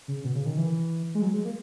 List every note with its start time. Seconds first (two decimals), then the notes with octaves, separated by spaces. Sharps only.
0.08 C#3
0.24 B2
0.35 C#3
0.46 D#3
0.57 E3
1.15 G#3
1.22 F#3
1.34 G#3
1.45 A#3